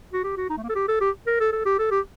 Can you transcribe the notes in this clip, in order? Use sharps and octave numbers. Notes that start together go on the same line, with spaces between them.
F#4
G4
F#4
D#4
A3
A#3
A4
G4
A4
G4
A#4
A4
A4
G4
A4
G4